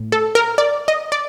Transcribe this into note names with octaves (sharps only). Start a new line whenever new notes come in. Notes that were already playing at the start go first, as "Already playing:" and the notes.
Already playing: A2
A4
A#4
D5
D#5
D5